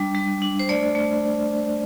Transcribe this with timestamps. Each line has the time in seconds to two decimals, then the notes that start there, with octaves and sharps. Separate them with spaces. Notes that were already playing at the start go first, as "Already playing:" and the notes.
Already playing: G3 D4
0.15 G3
0.42 D4
0.59 C5
0.69 A3 D5
0.95 A3